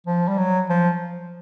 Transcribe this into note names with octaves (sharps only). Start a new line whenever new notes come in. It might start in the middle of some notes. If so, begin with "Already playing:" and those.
F3
G3
F#3
F3